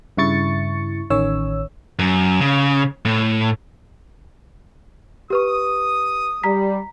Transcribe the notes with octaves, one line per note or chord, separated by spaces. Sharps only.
G2 C#3 E4 C#6 A6 C#7
A1 D#3 C#4 C#5 E6
F#2
C#3
A2
G4 B4 C#6 D#6
G3 A#5 B6